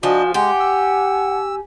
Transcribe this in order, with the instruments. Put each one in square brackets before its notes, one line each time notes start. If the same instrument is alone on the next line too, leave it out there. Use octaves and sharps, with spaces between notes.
[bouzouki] F3 [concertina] D4 D#5 [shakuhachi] F#4 [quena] G#5
[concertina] G#3 [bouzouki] G4 [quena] F#5 [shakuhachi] G#5
[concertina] E6